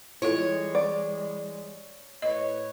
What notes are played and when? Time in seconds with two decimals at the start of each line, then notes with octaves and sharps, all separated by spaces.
0.22 E3 G3 G#3 E4 F4 A4 C#5
0.75 D5
2.22 A2 B4 C#5 D#5